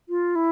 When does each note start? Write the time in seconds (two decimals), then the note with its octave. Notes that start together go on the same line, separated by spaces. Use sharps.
0.09 F4
0.36 E4